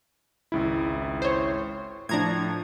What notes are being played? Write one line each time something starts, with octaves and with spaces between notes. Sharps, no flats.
G#1 C#2 E4
C5 C#5
A2 F3 D4 A#5 G#6